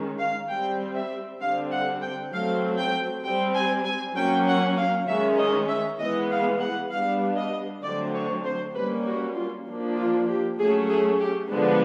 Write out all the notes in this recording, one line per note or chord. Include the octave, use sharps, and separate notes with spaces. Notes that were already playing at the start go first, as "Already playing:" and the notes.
Already playing: D#3 G#3 C#4
F5
G3 C4 G5
E5
D3 G3 C4 F5
F#5
G5
F#3 A3 C4 F5
G5
G3 C4 G5
G#5
G#5
F#3 A#3 C#4 G5
F#5
F5
D#3 G#3 C#4 E5
D#5
E5
E3 G#3 B3 D#5
F5
F#5
G3 B3 D4 F5
D#5
D3 F#3 A3 C4 D5
C#5
C5
G3 A#3 C#4 B4
F#4
F4
F3 A#3 D4
F4
G4
F#3 A3 C#4 G#4
G#4
G4
D3 F3 G#3 B3 D4